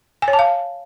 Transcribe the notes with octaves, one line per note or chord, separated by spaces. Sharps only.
G#5
C#5
A5
F5